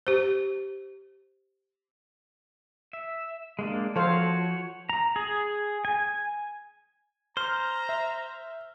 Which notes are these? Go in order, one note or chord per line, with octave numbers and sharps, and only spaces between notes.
G4 C5
E5
G#3 A#3 D4
F3 F#4 A4 C5 C#5 F5
A#5
G#4
G#5
C5 A#5 F6
E5